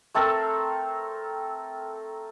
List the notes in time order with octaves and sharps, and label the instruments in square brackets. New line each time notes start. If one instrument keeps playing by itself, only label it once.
[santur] A3 C4 A4 A#4